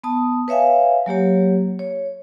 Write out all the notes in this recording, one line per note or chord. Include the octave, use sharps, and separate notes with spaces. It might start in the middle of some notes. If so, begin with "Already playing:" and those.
B3 A5 D#6
B4 C#5 E5 F5 G#5
F#3 A#3 G4 C#5
C#5